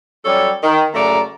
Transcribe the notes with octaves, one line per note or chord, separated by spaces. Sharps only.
F#3 G3 C#4 A4 C#5 D5
D#3
F#2 C#3 A3 D5 A#5